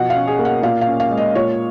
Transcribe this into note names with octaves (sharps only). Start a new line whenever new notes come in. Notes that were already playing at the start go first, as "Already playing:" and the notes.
Already playing: B2 F3 F#5
F5
C#4
G#4
A#3
F#5
A#2 F5
F5
C#4
F5
G#3
D#5
A#2 C#5